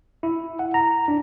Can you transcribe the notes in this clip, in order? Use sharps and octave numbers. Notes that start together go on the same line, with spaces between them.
E4
F#5
A#5
D4